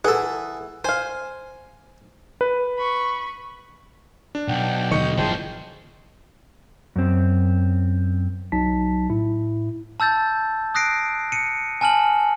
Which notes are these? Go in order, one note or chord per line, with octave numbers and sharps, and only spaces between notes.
E3 G#4 A4 F#5
C5 F5 G#5
B4
B5 C#6
D4
B1 F#5 G5
D#2 D3 D#3 D#5 C#6 G6 C#7
F#1 G#2 E3 F3 G#4 C5 G5 A5
F#2 C4
B1 F#3 D#4 A5 B6
A2 E4
A5 E6 G6 A6
D#6 F#6 A#6 C7 D7
C#7 D#7
G#5 A5 F6 F#7